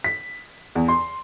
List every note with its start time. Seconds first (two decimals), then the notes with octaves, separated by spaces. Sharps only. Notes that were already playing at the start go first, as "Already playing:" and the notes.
0.04 B6
0.75 E2
0.88 C6